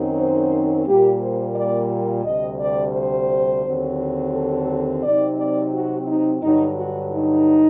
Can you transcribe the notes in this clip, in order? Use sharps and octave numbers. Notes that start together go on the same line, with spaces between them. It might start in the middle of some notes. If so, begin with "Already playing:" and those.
Already playing: F#2 D#3 F#3 C4 D#4
C5
A#2 G3 A#3 G4
C5
D5
D2 C3 G3 D#5
D5
C5
D#2 D3 F#3 C4
A4
C3 F#3 C4 D#4 D5
D5
F#4
D#4
G2 D3 F#3 D#4
F#4
D#4